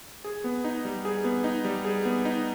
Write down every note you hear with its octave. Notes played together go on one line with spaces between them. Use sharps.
G#4
B3
D#4
G3
G#4
B3
D#4
G3
G#4
B3
D#4